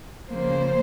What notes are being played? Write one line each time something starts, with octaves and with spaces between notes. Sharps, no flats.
C#3 F3 A#3 C5